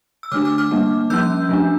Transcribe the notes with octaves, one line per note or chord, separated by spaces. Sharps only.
E6
D3 A3 D4 D6 F6
D6 F6
D6 F6
G3 A#3 D4
F3 A#3 C#4 E6 G6
F3 A3 D4